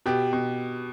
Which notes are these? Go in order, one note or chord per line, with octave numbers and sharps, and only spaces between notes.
B2 G4
B2